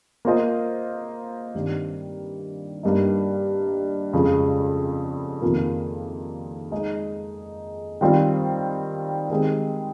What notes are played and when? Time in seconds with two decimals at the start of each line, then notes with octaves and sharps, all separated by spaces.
0.25 A#3 F4 C5 D#5
1.55 G2 D#3 G3 C4
2.83 G2 G3 A#3 D#4
4.13 F2 C#3 G#3
5.42 F2 C3 D#3 A#3 F4
6.71 G#3 D#4 G#4
8.01 D#3 G3 C4 F4 C5
9.30 D#3 G#3 C4 G4